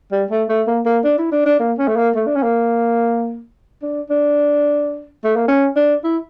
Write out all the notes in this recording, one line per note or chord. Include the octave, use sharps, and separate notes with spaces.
G3
A3
A3
A#3
A#3
D4
E4
D4
D4
A#3
C#4
A3
A#3
A3
D4
C#4
A#3
D4
D4
A3
A#3
C#4
D4
E4